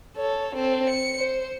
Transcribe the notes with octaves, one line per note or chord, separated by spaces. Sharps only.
A4 C#5
C4 A4
C#7
C5